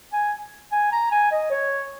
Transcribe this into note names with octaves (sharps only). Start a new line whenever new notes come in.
G#5
G#5
A#5
G#5
D#5
C#5